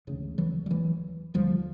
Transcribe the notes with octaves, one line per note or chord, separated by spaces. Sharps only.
E1 D2 C#3
E3 F#3
G3
E3 F#3
E1 D#2 D3 F3 G3